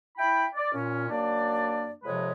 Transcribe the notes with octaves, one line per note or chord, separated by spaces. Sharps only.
E4 G5 B5
D5
A#2 C#4
F#2 A#3 D4 D5
F2 C3 F3 G#3 B4 C#5